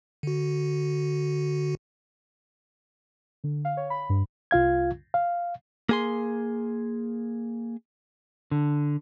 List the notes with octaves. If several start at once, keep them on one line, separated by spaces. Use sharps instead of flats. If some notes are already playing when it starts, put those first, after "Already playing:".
D3 F#4
D3
F5
C#5
B5
G2
C2 F4 F5 G#6
F5
A#3 G#4 C6
D3